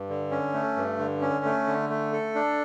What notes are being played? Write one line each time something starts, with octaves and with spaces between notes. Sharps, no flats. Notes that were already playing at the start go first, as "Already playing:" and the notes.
Already playing: G2
D3
C#4
A3
G2
D3
C#4
A3
D3
A3
A4
D4